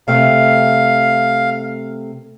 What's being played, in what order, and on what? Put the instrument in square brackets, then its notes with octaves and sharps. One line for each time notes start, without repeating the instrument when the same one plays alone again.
[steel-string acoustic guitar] C3 A3 [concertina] F5